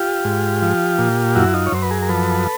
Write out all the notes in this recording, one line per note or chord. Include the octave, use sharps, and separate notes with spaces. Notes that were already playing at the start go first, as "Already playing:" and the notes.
Already playing: F4 G4
G#2
F3
A#2
F#2 E4 F#4
D#4 F4
C#5
F#2 C5
B4
G#4 A#4
A#4
F3 A4 B4